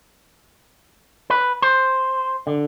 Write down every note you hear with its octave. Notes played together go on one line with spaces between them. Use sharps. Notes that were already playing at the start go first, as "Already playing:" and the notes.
B4
C5
D3